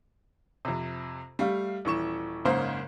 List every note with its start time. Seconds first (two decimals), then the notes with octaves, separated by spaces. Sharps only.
0.65 F2 C3
1.39 G3 A3 F5
1.85 D#1 E3 C#6 E7
2.45 F#1 G#2 C#3 A#3 C5